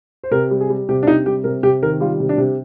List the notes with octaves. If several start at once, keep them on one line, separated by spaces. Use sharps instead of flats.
C5
C3 A#4
G3
G#4
G3
C3 G4
D4
C3 D#4
G3 G4
C3 A#4
C3 G4
D#3 A#4
G3 F4
C3
D4
C3